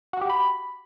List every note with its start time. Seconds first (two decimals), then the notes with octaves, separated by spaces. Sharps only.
0.13 F#4
0.21 G4
0.30 B5